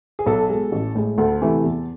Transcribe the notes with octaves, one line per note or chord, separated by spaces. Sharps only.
G#4
B1 A4
B2 G#3
A1
A2 G#3
D2 A4
C3 E3 A3 E4
E2